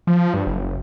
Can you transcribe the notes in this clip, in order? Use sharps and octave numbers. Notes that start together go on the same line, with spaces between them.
F3
G2
F#1